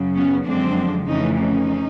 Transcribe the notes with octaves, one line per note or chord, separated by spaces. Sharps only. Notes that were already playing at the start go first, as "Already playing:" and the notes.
Already playing: F#2 C#3 F#3
B3 C#4
F#2 D3 F3 G#3 C4 D4
F2 C#3 E3 A3 C#4 D#4
C#4 D#4